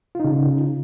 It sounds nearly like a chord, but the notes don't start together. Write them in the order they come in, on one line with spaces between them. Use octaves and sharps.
F4 D#4 C#3